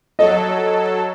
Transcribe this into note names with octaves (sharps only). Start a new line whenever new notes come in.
F#3 A4 D#5